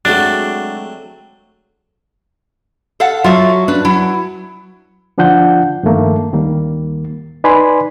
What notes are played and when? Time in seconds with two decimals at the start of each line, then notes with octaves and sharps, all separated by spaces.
0.05 F#3 G#3 A3 C4 D4 F#4
3.00 A4 F5 F#5
3.24 F#3 F4 A4 E5
3.68 D4 B4
3.85 F#3 E4
5.18 D3 F3 D4 F4 F#5 G6
5.83 G2 D#3 F3 A3 A#3
6.33 D2 D#3 G3 A#3
7.44 D#4 B4 D5 G#5 B5 C6